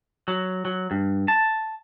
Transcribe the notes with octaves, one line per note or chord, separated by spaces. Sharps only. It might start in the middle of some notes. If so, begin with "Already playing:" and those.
F#3
F#3
G2
A5